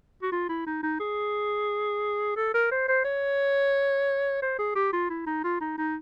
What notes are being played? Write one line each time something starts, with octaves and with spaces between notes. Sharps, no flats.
F#4
F4
E4
D#4
D#4
G#4
A4
A#4
C5
C5
C#5
C5
G#4
G4
F4
E4
D#4
F4
D#4
D#4